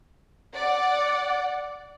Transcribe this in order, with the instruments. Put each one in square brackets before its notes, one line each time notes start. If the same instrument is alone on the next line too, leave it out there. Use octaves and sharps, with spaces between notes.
[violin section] D5 F#5